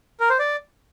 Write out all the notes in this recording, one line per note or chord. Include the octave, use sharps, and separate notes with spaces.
A#4
C5
D5